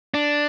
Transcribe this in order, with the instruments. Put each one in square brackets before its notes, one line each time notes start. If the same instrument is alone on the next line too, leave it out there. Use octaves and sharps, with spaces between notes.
[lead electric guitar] D4